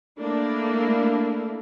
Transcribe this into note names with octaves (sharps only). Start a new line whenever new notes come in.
A3 A#3 D4 E4